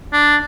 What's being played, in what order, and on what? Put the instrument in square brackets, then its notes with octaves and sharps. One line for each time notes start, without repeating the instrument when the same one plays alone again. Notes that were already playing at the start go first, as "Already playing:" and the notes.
[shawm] D4